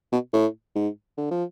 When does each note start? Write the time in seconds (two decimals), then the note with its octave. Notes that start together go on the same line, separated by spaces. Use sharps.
0.12 B2
0.33 A2
0.75 G#2
1.17 D3
1.31 F3